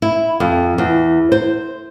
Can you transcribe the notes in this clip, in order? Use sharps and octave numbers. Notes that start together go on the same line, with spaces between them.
E4
F2
E2
C5